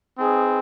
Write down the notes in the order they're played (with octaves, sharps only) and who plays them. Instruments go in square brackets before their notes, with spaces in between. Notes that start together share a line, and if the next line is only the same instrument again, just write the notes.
[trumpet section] C4 D#4 G#4 B4